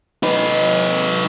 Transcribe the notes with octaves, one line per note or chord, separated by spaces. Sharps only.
D#4 B4